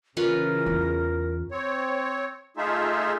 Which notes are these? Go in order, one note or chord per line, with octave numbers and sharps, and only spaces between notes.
C#3 E3 C#4 F4 A#4 B4
E2
C4 C#5
A3 D#4 F4 G#4 E5